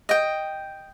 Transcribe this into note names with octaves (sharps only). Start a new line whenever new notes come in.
D#5 G5